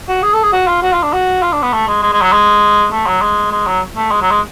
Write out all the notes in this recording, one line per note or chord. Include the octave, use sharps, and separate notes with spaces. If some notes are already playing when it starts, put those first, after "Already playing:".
F#4
G#4
A4
G#4
F#4
F4
F#4
F4
D4
F#4
F4
D4
B3
A3
G#3
G#3
G#3
F#3
G#3
A3
F#3
G#3
G#3
F#3
A3
G#3
F#3
G#3